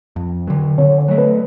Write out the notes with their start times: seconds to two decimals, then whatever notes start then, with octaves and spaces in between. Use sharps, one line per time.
0.16 F2
0.47 D3 F#3
0.78 D3 C#5
0.98 C#5
1.08 F#3 A3
1.18 B4